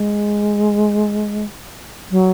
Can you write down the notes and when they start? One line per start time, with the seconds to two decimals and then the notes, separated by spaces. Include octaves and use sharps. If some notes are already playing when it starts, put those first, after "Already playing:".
Already playing: G#3
2.11 F#3